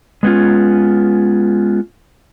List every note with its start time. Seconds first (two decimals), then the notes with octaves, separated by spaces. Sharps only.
0.23 G#3 B3 C#4 F4